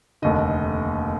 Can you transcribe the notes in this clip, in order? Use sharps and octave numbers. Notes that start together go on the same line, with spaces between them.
F1 D#2 D3 D#5